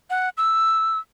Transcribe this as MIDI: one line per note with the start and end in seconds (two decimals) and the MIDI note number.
0.10 0.29 78
0.37 0.98 88